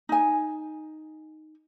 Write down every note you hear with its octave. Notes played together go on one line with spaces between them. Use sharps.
D#4 G#5